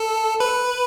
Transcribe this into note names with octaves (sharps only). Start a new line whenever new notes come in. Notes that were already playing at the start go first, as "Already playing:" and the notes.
Already playing: A4
B4